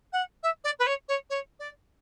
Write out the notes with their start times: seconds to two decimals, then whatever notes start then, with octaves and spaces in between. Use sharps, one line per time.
0.12 F#5
0.43 E5
0.64 D5
0.79 B4
0.86 C#5
1.08 C#5
1.30 C#5
1.59 D5